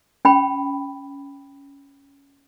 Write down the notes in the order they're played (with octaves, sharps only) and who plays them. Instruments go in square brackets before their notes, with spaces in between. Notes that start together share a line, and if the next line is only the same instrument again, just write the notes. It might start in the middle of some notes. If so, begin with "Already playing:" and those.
[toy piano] C#4 G5 B5